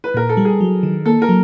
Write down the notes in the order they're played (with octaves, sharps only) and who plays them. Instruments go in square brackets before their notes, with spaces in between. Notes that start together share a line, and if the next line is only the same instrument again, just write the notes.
[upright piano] B4
[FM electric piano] A#2 [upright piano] A#4
[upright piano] A4
[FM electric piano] G3
[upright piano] G#4
[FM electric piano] F#3
D#3
[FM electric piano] A#3 [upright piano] A4
[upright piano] A#4
[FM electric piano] F#3